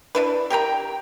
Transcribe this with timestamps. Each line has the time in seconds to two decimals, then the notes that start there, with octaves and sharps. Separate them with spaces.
0.15 D4 E4 B4
0.50 G4 A#4 G5 A#5